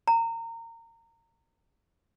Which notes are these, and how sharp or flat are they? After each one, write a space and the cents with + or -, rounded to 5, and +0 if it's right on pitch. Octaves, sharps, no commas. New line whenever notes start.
A#5 -25